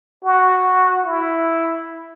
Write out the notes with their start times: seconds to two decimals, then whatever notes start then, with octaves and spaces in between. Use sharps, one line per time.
0.25 F#4
1.05 E4